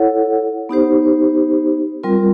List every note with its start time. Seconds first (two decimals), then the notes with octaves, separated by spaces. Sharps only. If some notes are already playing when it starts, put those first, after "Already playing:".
Already playing: E4 A4 C#5 F#5
0.69 B3 D#4 G4 C5
2.03 G3 C4 F4 A#4